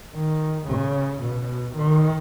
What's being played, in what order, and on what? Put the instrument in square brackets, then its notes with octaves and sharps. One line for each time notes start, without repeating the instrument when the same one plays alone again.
[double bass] D#3
C#3
B2
D#3